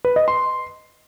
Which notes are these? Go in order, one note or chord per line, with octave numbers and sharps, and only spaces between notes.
B4
D#5
C6